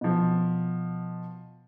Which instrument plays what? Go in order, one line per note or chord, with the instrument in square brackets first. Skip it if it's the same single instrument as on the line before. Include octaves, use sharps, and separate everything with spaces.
[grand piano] B2 F3